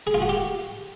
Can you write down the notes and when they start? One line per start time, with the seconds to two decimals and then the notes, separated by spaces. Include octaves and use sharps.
0.07 G#4
0.14 F4
0.22 F#4
0.29 G4